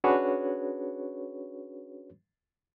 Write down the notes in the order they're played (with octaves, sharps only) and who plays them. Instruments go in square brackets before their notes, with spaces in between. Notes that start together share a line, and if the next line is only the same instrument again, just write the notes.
[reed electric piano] C#4 D4 F#4 G#4 B4 C#5